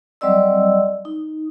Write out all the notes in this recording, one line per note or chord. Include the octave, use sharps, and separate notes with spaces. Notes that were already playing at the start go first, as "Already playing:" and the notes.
F#3 G3 C4 D5 D#5 E6
D#4